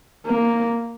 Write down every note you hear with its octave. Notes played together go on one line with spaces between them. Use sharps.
A#3